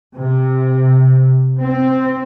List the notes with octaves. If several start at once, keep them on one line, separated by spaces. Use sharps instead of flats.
C3
C4